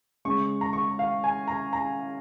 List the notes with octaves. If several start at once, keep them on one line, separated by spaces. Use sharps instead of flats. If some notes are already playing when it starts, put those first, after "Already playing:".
C#3 G#3 C#6
A#5
C#6
A#5
F5
G#5
A#5
A#5